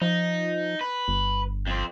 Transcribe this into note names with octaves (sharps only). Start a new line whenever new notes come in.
F3 D#4
B4
G1
F2 C4